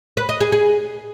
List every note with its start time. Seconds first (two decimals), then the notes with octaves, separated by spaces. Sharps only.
0.17 B4
0.29 D#5
0.41 G#4
0.52 G#4